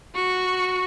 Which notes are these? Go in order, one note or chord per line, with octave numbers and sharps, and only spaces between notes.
F#4 C#6